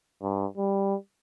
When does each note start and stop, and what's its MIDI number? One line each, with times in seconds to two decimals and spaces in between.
0.22 0.46 43
0.58 0.95 55